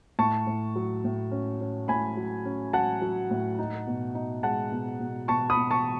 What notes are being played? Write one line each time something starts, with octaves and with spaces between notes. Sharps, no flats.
A2 A5 C#6
A2
F#3
A2
C#4
C#4
A2 G#5 B5
F#3
C#4
F#3 F#5 A5
F#3
A2
D#4
B2
D#4
G#3 F#5 A5
B2
B2
B2 A5 C#6
B5 D#6
B2
A5 C#6